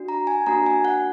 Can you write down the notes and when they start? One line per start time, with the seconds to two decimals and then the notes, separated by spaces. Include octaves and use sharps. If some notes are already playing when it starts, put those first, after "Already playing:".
Already playing: D4 F#4
0.08 A#5
0.27 G#5
0.46 A#3 D4 F#4 A#5
0.66 G#5
0.85 F#5